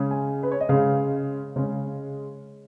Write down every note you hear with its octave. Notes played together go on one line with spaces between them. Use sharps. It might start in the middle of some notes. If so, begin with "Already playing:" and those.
Already playing: C#3 G#3 C#4
G#5
B4
C#5
D#5
C#3 G#3 C#4 F5
C#3 G#3 C#4